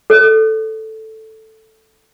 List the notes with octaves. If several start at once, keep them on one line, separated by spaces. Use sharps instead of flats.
A4 C#5